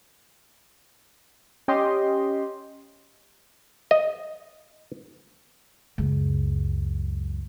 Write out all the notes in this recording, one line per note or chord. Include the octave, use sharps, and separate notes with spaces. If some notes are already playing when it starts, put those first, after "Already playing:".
C#4 G4 D#5 C6
D#5
C#2 F#2